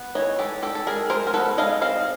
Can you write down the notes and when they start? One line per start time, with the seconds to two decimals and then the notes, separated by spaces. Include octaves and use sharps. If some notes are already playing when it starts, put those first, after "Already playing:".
Already playing: B3
0.15 E3 C#5 D#5
0.39 G#3 G4 A4
0.62 G#3 G4 A4
0.75 A4
0.87 G#3 G#4 A#4
1.10 G#3 A#4 C5
1.27 A#4
1.34 B3 A4 B4
1.58 G#3 D#5 F5
1.81 C4 D#5 F5